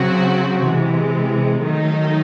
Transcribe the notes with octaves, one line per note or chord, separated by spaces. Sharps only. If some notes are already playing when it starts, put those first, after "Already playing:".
Already playing: C#3 F#3 C4 F#4
C3 E3 G#3
D#3 F#3 A3 D#4